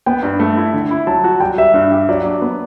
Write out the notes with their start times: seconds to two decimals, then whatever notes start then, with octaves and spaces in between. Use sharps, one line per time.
0.06 B3 G5
0.23 G2
0.40 A3
0.57 E4
0.73 D3
0.91 E4
1.07 F#3 A5
1.24 F#4
1.40 G3 G5
1.57 G3 E5
1.74 G2
1.92 G4
2.09 F#3 D5
2.25 D4
2.42 B3